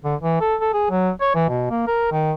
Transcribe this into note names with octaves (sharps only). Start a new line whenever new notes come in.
D3
E3
A4
A4
G#4
F#3
C#5
E3
B2
A#3
A#4
D#3